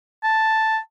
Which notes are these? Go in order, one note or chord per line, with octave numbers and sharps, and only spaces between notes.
A5